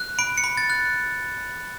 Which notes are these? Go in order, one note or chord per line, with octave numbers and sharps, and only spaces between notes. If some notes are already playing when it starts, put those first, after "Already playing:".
Already playing: F#6
B5 D7
C#7
B5
A6
F#6